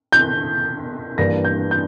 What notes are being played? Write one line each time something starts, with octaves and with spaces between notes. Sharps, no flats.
G6
G2 E3 A#3 D4 A#6
G6
G6